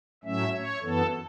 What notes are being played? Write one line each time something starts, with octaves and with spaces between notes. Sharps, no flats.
A2 F#3 A3 C#4 E5
C#5
F#2 E3 B3 A4